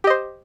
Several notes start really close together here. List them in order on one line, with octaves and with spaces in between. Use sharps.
G4 D#5 C5